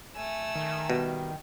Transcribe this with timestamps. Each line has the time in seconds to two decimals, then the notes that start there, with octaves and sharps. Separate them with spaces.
0.16 A3 G#5 E6
0.56 D#3
0.90 B2 G3